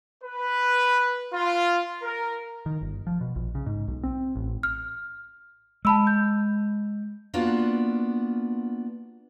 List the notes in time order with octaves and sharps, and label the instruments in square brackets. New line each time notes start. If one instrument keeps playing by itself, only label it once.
[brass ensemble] B4
F4
A#4
[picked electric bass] D#3
G1
F3
B2
A#1
C#3
G#2
B1
C4
A1
[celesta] F6
[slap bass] G#3 [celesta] A5 B5 E6
[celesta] G6
[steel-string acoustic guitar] A#3 B3 D4 F4 F#4